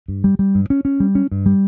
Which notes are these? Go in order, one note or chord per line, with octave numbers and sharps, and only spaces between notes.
G2
G3
G3
G2
C#4
C#4
G3
C#4
G2
G3